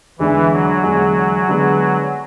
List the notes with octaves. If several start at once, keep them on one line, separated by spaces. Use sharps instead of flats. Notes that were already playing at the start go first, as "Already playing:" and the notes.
E2 D3 E3 G#3 D4
F#3
E2 D3 G#3 D4
D3 G#3 B3 D4 G#4